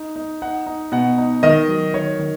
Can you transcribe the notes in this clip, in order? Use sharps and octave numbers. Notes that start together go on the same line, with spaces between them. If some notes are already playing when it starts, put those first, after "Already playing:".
Already playing: D#4
D#4
D#4 F#5
D#4
B2 F#5
D#4
D#3 D#5
F#3
D#3 C#5
D#3